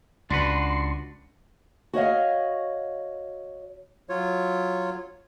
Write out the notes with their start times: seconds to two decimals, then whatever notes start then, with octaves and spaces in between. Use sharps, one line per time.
0.30 C#2 D4 F#4 B4 C6
1.93 F#4 C#5 D#5 F5
4.09 F#3 F4 C#5